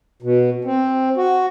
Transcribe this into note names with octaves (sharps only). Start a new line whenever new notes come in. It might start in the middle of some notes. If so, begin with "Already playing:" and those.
B2
C4
F#4